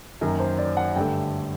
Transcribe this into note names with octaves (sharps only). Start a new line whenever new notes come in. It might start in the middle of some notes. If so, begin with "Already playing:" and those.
F#2 D#3 F#3 A#3 A#4
C5
D5
F#5
G2 D3 A3 G5